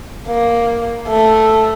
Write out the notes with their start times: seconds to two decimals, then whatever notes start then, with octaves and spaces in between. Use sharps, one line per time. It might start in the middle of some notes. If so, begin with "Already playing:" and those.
0.27 A#3
1.08 A3